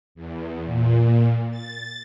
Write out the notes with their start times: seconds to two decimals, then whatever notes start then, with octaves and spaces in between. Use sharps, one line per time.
0.15 E2
0.65 A#2
1.51 A6